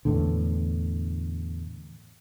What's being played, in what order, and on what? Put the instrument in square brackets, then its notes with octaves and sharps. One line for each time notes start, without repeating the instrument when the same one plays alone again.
[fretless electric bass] E2 A2 D3